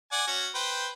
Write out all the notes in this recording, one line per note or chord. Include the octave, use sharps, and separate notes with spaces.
D5 F#5 G#5
C#4 F#4
B4 C5 G5